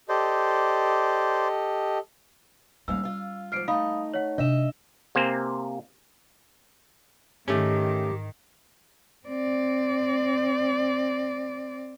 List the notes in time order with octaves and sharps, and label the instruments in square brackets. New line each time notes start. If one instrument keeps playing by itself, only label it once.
[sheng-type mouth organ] G4 A4 D#5 [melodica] C5 D5
[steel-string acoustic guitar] D#2 G#2 F5 [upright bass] G3 C#4 [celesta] E6
[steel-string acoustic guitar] F4 F5
[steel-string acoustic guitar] G#2 F3 [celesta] F6 C7 D7
[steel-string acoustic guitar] A3 D#4 [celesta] F5 B5 D#6
[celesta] C#5 F#5
[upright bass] C3 [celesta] D4 E7 [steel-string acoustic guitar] D#5 E5
[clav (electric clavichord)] C3 A#3 C4 C5 G#5
[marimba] G#2 [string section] D#3 [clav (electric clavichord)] A3 C#4 [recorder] G4
[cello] C4 D5